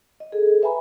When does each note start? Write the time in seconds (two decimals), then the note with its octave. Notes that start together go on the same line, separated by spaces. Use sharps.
0.20 D#5
0.32 G#4 A4
0.62 B4 E5 G5 G#5 A#5 B5